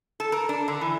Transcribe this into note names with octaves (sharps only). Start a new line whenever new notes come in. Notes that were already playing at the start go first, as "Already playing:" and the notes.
A4
A#4
D4
D3
E3